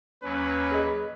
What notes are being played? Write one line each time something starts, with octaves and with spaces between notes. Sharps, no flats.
D#2 F#3 C#4 B4
G#4 D#5